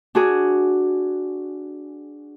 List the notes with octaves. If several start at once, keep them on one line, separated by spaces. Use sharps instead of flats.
D4 F#4 G#4